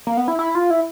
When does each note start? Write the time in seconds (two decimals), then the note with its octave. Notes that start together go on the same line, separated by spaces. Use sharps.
0.07 A#3
0.17 B3
0.28 E4
0.39 E4
0.55 F4
0.71 E4